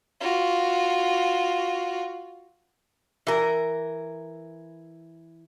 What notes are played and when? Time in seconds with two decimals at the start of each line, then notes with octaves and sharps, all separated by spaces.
0.21 F4 F#4
3.27 E3 A#4